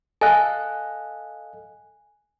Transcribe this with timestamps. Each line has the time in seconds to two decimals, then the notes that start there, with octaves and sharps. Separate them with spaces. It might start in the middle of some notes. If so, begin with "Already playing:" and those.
0.21 A4 D#5 F5 G#5 F#6